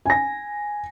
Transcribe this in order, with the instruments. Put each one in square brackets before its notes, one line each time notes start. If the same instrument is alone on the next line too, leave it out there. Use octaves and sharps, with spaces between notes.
[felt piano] G#5 A#6